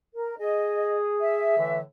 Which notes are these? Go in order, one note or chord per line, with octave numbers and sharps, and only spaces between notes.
A#4
G#4 D#5
E5
A2 D3 E3